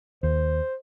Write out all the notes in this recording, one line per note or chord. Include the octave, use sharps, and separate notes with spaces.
D#2 C5